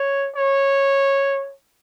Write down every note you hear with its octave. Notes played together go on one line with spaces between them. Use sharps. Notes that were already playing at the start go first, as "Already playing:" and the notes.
Already playing: C#5
C#5